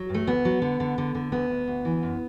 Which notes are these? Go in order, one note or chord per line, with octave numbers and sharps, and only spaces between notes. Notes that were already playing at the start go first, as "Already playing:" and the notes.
Already playing: F#3
G2
A3
D2 B3
F#3
D3
D3
D3
D3
D2 B3
D2
D2
E3
F#2